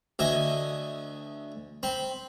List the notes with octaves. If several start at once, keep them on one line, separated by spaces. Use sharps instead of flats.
D2 D#5 E5 G#5
C4 B5